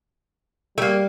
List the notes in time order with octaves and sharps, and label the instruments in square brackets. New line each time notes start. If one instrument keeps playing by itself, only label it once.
[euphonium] G3 [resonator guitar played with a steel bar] A3 A#3